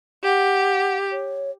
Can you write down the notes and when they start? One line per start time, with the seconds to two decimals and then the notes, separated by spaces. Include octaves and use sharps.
0.25 G4 F#5
1.12 C#5